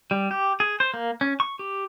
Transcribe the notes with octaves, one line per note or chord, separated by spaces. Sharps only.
G3
G4
G#4
C5
A#3
C#4
C#6
G4